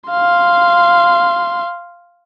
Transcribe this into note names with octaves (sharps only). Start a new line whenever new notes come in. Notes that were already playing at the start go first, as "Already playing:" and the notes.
F5 C6